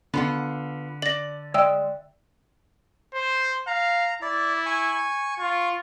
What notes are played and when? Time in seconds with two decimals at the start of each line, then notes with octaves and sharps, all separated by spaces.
0.14 D3 B3 F4 F#5
1.02 D5 A#6 F#7
1.54 G#3 D5 E5 G5 E6
3.14 C5
3.67 F5 A#5
4.22 E4 D5
4.66 G#5 C#6
5.40 F4 C#6